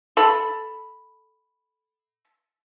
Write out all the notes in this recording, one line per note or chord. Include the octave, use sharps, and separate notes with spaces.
A4 B5